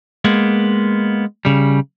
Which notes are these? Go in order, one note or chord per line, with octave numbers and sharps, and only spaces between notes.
G#3 A#3 B3
C#3 G3